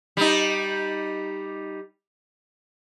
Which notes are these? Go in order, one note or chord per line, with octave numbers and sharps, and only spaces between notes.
G3 D#4